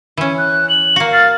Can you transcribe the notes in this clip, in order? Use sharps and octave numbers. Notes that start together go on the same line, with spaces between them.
E3 C#4
F#6
F#7
A#3 F#4
F5 A6